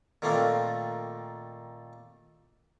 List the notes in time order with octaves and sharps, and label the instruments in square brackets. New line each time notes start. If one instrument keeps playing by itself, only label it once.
[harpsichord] A#2 D#3 A3 A#3 C4